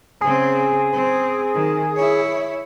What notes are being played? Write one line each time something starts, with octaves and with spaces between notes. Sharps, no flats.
C#3 C4 G#4
C4
D#3
E4 C#5